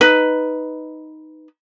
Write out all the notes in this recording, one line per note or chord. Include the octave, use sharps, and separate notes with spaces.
D#4 B4